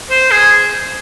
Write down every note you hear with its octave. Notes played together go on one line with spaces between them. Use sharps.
C5
G#4